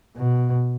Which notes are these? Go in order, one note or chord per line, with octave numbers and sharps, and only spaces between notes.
B2